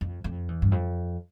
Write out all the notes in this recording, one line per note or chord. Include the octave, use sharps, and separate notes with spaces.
F2
F2
E2
G2
F2